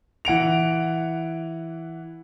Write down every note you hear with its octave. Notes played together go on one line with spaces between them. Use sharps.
E3 F#5 D7 F7